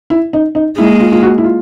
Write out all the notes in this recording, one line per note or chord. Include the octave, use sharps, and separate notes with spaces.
E4
D#4
D#4
G#3 A#3 E4
F4
F4
F#4
E4
F4